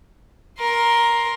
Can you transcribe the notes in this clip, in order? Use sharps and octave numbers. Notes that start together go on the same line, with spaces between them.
A#4 C6